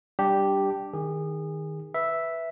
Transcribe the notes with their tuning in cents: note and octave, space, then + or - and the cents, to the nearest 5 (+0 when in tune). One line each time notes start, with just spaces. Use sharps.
G3 +0 D4 +0 G4 +0
D#3 +0 G#4 -25
B4 +0 E5 +0